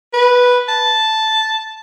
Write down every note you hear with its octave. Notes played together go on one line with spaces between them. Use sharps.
B4
A5